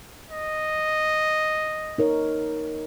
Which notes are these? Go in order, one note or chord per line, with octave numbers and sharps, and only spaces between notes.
D#5
D#4 A#4 C#5